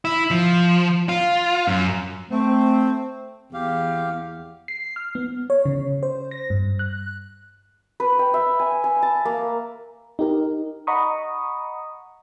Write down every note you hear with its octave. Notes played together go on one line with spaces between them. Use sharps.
E4
F3
F4
F#2
A3 C4
E2 G4 F5
C7
F6
B3
C#5
C#3
C5
A#6
G2
F#6
B4
G5
E5
G#5
G#5
A5
A#3
D#4 G4 A#4
D#5 F#5 A#5 B5 C#6 D#6